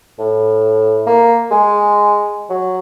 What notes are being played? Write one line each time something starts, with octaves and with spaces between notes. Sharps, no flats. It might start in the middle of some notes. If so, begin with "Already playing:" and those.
A2
A#3
G#3
F#3